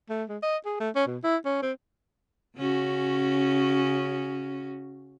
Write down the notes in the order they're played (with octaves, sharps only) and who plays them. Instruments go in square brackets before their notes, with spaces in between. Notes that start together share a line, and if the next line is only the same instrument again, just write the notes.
[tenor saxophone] A3
G#3
D#5
G#4
A3
C#4
B2
E4
C#4
C4
[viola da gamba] C#3 C#4 F#4